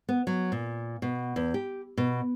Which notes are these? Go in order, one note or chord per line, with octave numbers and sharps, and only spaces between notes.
B3
F#3
A#2
B2
E2
G4
B2